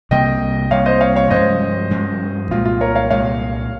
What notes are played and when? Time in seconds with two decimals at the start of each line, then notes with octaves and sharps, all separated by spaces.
0.11 C2 C3 G3 A#3 D#5 G5
0.70 C2 C3 G3 A#3 C#5 F5
0.86 C5 D#5
1.01 C#5 F5
1.16 C#5 F5
1.30 G2 F3 G#3 C#4 C5 D#5
1.91 G2 F3 G#3 C#4
2.51 C2 A#2 G#3 F4
2.66 F4
2.81 A#4 C#5
2.95 C#5 F5
3.10 C2 A#2 G#3 C#5 F5